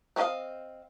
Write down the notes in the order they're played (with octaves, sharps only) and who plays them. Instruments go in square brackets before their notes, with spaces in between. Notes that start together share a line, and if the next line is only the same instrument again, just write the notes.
[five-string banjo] C4 C#4 D#4 D#5 F5